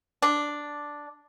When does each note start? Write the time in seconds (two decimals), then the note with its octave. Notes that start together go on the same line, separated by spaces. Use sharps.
0.22 D4